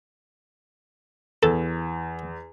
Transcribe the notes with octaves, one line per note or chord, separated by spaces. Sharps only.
E2 A4